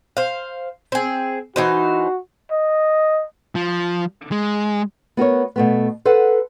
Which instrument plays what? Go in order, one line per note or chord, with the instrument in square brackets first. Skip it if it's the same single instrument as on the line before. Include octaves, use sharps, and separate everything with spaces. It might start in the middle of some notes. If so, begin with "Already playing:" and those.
[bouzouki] C5 F5
C4 G#4
[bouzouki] E3 D#4 C5 [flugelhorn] F#4
[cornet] D#5
[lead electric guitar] F3
G#3
[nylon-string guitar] B3 F#4 A#4 C#5
B2 A3 B3
A4 B4 C5 F#5